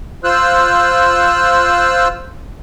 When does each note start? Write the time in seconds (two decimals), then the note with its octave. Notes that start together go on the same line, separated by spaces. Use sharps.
0.24 F4 C5 E6 F#6